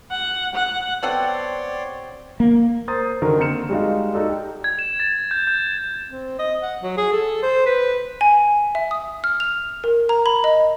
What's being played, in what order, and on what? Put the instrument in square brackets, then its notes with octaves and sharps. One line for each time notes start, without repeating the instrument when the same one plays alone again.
[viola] F#5
F#5
[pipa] B3 A4 F#5 [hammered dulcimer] C4 G4 [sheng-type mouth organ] C#5 D5 C6
[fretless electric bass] A#3
[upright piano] A#4 C5 C6 D#6 A6
D3 D#3 F#4 A#4
D3 A#3 C4 F6 C#7 E7
G3 G#3 D#4 F#4 F5
D#4 F#4 A4 D5
G4
[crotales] G#6
E7
A6
G6
G6
[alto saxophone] C4
D#5
F#5
F#3
G#4
A4
C5
B4
[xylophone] G#5
E5
D#6
F6
F7
A#4
A#5
B5
D#5